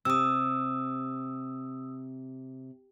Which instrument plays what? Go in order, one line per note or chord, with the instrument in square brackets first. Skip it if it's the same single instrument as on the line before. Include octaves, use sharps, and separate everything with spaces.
[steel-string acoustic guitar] C3 [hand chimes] D#6 E6